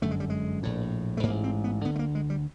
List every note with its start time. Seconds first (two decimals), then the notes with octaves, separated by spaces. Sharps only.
0.02 G1 F#2 D3 A3
0.11 G#3
0.20 G3
0.30 G#3
0.63 A#1 A2
1.17 A3
1.23 G#2 A#3
1.28 A1
1.44 C4
1.64 B3
1.84 D2 D3 B3
1.95 A3
1.99 A#3
2.15 G#3
2.30 G3